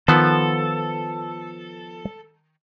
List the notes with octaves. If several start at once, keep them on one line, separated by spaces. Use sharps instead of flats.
D#3 F3 B3 A4 F#5